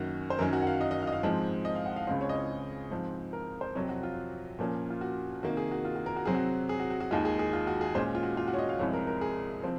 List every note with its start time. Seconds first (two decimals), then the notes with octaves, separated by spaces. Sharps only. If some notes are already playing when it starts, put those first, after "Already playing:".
Already playing: F#2 D#3 A#3 C#4 F#4
0.30 C5
0.39 F#2 D#3 F#3 C#4 A#4
0.53 F#4
0.62 F#5
0.67 F5
0.81 D#5
0.91 D#5
1.02 F5
1.07 D#5
1.12 F5
1.23 G#2 F3 G#3 C4
1.65 D#5
1.75 F5
1.86 F#5
1.96 F5
2.07 C#2 C#3 G#3 C4 F5
2.21 C#5
2.29 D#5
2.35 C#5
2.91 G#2 F3 C4
3.33 A#4
3.61 C5
3.75 F2 C3 F#3 C4 C#5
3.89 F#4
4.03 F4
4.59 A#2 F3 A#3 C#4
4.90 F4
5.01 F#4
5.43 C3 D#3 A#3 F#4
5.57 G#4
5.71 F#4
5.85 F4
5.95 F#4
6.06 A#4
6.16 F#4
6.25 C3 F#3 C4 G#4
6.35 F#4
6.69 G#4
6.80 F#4
6.90 F#4
7.01 F#4
7.11 D#2 D#3 G#3 F4
7.25 G#4
7.39 G#4
7.53 F4
7.67 F#4
7.81 G#4
7.95 A#2 G#3 C#4 C5
8.15 F4
8.23 F#4
8.37 F4
8.48 F#4
8.53 C#5
8.58 D#5
8.69 F5
8.79 C2 C3 F3 G#3 C#5
8.93 A#4
9.07 A#4
9.21 G#4
9.63 C3 F3 C4